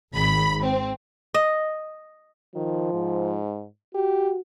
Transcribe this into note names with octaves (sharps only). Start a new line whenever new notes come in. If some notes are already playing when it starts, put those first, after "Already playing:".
G#1 B5
C4
D#5
D#3 F3
G#2
F#4 G4